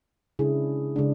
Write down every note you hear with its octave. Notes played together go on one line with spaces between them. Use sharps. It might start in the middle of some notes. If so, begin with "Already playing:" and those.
C#3 G#3 D4 E4 G#4
C#3 G#3 D4